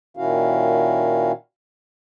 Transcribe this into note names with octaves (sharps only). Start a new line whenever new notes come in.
A#2 D#3 C#4 E4 F#4 F5